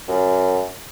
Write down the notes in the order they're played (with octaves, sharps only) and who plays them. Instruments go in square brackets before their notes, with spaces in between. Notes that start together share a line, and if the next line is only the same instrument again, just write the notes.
[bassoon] F#2